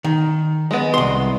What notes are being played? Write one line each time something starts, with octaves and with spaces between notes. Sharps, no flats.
D#3
G#3 B3
C2 C6